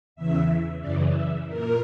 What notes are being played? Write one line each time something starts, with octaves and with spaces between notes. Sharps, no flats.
E2 C#3 E3 E5
F#2 C#3 E3 D5
E5
A#2 A#4